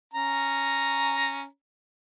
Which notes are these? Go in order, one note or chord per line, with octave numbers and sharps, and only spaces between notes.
C#4 A#5